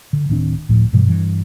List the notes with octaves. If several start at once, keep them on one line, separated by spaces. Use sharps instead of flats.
D3
D1 D#3 C4 D4
D2 A2 F3
G2 B2 E3 G3
G2 E3